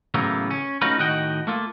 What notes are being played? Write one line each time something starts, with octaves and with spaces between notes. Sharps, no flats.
A2 C#3 E3 F#3 A#3 B3
C#4
A3 C#4 D#4 F4 F#4 B4
A2 D#3 F#4 D#5 F#5 G5
A3 A#3 F4